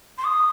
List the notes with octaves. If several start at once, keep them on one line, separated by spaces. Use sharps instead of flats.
C6
D#6